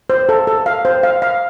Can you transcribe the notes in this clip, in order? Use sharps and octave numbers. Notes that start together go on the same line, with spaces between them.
C5
A4
A4
F5
C5
F5
F5